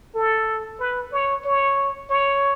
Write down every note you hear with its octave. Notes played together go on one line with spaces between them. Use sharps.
A4
B4
C#5
C#5
C#5